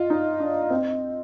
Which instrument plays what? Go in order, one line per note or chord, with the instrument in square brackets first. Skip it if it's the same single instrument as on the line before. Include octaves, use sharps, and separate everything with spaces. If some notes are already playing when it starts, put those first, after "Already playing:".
Already playing: [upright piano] F4 [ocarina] D#5
[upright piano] D#4
D4
C4